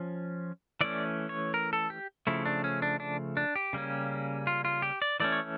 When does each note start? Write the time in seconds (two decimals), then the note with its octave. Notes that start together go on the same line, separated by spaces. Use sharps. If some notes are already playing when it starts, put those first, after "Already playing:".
Already playing: F3 C#4
0.81 E3 A3 C#4 D5
1.29 C#5
1.54 A#4
1.73 A4
1.90 G4
2.27 C#3 F3 A3 E4
2.45 D4
2.64 C#4
2.82 D4
3.00 D4
3.37 D4
3.56 G4
3.73 C#3 G3 A#3 C#4
4.47 F4
4.65 F4
4.82 G4
5.02 D5
5.20 E3 A3 C#4 D5
5.32 C#5